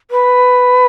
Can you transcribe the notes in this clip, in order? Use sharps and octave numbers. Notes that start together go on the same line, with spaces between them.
B4